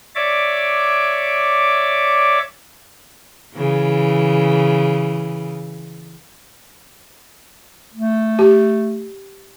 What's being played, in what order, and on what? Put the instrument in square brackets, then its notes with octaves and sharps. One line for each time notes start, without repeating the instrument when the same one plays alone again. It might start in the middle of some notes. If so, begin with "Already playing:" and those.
[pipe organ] C#5 D5 E5 D6
[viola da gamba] C#3 E3
[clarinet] A3
[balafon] G4